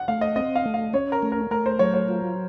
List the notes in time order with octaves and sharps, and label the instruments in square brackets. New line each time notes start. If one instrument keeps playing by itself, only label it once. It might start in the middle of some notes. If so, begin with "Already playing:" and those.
Already playing: [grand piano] F#5
[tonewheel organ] A3 [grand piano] F5
[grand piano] D#5
[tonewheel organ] C4 [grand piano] D#5
[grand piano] F5
[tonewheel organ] A3
[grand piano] F5
[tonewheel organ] C#4 [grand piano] C#5
[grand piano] A#4
[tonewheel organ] A3
[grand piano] A#4
[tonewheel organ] A3 [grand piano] A#4
[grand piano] C5
[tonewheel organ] F#3 [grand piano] C#5
[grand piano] C#5
[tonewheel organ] F4